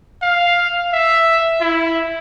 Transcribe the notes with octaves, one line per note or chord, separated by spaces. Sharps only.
F5
E5
E4